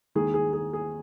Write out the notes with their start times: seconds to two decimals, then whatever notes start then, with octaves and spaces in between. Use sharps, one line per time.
0.15 D#2 D#3 G#3 G#4
0.34 G#4
0.53 G#4
0.73 G#4